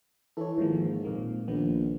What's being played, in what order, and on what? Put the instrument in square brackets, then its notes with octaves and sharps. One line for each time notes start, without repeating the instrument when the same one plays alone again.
[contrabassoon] E3 [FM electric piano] A4 C#5
[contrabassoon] G#2 [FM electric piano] D#3 F3 A#3
[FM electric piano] A#2 A#3 C4
[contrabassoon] A#1 [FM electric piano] D#3 B3